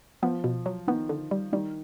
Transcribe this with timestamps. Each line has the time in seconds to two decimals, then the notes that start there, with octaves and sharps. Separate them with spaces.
0.22 F3 B3
0.44 B2
0.66 F#3
0.87 D#3 B3
1.09 D3
1.31 G3
1.52 D#3 G3